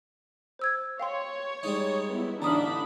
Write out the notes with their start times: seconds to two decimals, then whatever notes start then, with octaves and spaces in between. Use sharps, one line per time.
0.59 C5 E6 G#6
1.00 C#5 F5 G5 C6
1.63 G3 G#3 D#4
2.10 B3 E4
2.42 A1 D3 D4 D#4 A#5 B5 D#6 F6